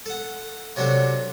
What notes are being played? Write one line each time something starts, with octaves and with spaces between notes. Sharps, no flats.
A4 F#5
C3 F#3 D4 F#4 A4